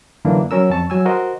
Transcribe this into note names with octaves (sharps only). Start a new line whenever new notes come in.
F#2 D3 E3 A#3 D4
F#3 C#4 A#4 E6
F2 A5 C#6
F#3 G#5 E6
F#4 A#4 C5 D#5